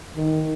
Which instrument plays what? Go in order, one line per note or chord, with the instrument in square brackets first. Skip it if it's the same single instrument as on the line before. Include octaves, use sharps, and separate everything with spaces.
[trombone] D#3